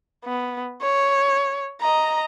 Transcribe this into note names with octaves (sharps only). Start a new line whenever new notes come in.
B3
C#5
D#5 A#5